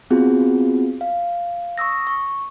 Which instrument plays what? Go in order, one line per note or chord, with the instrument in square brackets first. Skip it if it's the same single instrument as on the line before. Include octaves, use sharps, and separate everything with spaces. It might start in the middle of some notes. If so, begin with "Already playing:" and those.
[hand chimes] B3 C4 F4 F#4 G#4
F5
C#6 D#6 E6 A#6
C#6